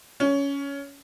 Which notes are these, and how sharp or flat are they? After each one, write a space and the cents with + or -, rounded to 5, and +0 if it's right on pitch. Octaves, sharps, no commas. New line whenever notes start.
C#4 +15